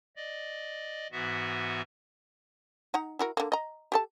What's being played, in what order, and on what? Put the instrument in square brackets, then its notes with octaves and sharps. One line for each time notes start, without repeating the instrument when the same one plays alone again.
[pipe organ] D5 D#5
G#2 E3 B3 F#4 E5
[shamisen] D#4 F#5 A#5
E4 F#4 A#4
D3 A#3
D#5 A#5
G4 A4 A5